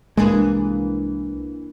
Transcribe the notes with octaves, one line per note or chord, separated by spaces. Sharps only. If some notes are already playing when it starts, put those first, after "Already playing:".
C2 E3 G#3 A#3 D4 G#4